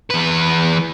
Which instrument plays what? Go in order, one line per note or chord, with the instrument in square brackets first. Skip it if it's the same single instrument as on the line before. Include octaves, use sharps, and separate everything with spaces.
[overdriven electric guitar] E2 B4